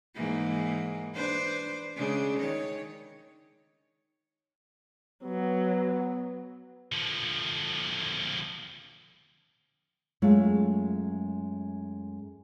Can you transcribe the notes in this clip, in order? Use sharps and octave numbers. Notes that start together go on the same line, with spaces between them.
G#2 E3 A#3
D4 B4 C5
C#3 G#3 D4
D#3 C#5
F#3 B3
D3 F3
F#2 G#3 A3 F4